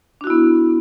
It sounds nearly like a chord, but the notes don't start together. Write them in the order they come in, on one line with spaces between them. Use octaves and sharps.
D4 F#4 E4 B3